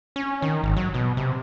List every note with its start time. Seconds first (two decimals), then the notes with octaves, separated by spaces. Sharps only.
0.16 C#4
0.42 D#3
0.63 G#1
0.76 F#3
0.94 B2
1.17 C3